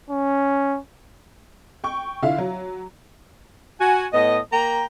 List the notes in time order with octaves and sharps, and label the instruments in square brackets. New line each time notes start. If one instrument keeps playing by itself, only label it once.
[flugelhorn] C#4
[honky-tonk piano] G5 C#6
D3 E4 F4 E5 F5
F#3
[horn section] F#4 G#5
A2 B3 D#5
A#3 G5 A#5